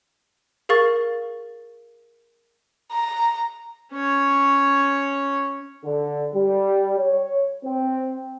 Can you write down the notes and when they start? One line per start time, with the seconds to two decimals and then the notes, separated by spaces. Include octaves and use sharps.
0.69 G#4 A#4 F5 C#6 A6
2.92 A#5
3.93 C#4 C#5
5.84 D3
6.33 G3
6.98 C#5
7.63 C4